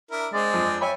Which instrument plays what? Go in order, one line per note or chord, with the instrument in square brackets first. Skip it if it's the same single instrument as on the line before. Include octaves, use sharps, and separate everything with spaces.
[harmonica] D4 E4 A#4
[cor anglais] G#3 [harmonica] C4 D4 G#4 [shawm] D5
[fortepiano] F2 F3
[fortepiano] C#5 G5 B5 [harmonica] E5 G#5